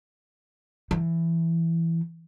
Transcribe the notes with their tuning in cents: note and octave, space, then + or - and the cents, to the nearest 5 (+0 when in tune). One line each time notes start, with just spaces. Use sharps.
E3 +10